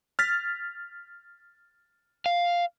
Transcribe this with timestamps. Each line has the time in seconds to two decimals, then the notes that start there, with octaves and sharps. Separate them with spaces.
0.19 F6 A6 B6
2.26 F5